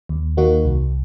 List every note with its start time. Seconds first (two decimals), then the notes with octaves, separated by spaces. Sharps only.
0.09 D#2
0.37 D#3 A#3 D#4 F#4
0.65 C2